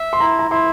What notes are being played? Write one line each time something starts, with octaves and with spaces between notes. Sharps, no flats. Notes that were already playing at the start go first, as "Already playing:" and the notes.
Already playing: E5
C6
E4 A#5
A#5
E4 C6